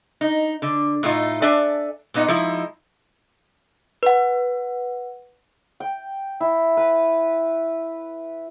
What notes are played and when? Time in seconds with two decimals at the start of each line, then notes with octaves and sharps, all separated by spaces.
0.21 D#4
0.62 D3
1.03 A2 A3 D#4 F4
1.42 D4 A4 D5 E5 G#5
2.14 A#2 B3 D#4 D#5
2.28 F3 G#3 D#4 E4
4.03 B4 F#5
5.80 G5
6.40 E4
6.77 B4